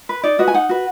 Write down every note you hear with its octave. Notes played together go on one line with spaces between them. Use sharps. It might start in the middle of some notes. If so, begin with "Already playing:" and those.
B4
D#4 D5
F#4 B4 D#5
G#5
D#4 F#5
F#4 B4